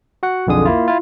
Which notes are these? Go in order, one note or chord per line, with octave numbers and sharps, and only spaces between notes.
F#4 F#5
B1 F2 D3 G#4 D#6
A#3 E4 F4
E4 F4